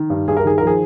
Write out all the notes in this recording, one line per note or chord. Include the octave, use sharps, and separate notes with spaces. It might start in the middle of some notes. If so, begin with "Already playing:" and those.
Already playing: D#3
G2
G2 G#4
A#4
D#3 G#4
F3 A#4
G#4